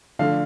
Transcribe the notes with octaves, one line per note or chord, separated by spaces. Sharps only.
D3 F3 A3 D4 F5